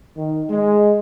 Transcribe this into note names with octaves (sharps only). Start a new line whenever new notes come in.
D#3
G#3